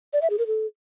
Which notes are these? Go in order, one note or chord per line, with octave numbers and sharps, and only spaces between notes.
D5
E5
G#4
A#4
A4